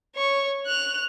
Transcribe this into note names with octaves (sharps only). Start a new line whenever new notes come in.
C#5 C#6
F#6 F7